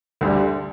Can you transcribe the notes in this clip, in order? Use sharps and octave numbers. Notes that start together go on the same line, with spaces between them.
D2 D3 G3